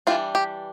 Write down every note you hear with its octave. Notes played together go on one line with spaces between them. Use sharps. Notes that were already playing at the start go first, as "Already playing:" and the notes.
E3 G3 D4 F4
G4